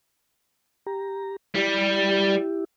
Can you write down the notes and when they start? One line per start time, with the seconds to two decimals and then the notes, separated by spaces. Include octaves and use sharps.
0.86 G4 A#5
1.55 G3 E4 G4